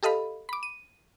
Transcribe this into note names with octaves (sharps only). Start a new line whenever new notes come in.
G4 A4 D#5 F5 B5
B5 D6
D#7